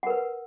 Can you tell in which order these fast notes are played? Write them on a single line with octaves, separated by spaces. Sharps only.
F#5 A#4 B4